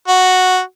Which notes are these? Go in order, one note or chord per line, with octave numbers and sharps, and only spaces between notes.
F#4